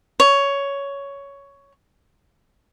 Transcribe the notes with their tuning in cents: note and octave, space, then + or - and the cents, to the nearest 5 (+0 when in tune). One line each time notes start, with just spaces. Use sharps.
C#5 +10